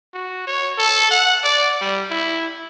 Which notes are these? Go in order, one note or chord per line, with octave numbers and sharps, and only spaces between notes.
F#4
C#5
A4
F#5
D5
G3
E4